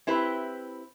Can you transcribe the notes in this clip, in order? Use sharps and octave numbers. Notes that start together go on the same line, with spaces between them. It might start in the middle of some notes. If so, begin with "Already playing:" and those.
C4 E4 G4 B4